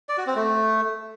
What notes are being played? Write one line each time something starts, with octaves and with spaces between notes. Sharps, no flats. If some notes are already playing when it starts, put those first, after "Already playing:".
D5
F#4
C4
A3